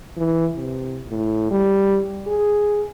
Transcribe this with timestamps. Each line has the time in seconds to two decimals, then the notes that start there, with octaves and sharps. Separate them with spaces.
0.17 E3
0.56 C3
1.08 A2
1.51 G3
2.27 G#4